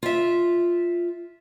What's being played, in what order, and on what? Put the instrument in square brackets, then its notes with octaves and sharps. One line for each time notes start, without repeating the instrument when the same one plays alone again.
[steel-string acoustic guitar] F4 E5